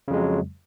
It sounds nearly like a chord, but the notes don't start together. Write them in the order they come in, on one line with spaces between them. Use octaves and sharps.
C#3 F2 G#3 F#3